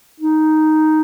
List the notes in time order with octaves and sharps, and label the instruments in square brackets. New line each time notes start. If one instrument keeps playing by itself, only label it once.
[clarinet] D#4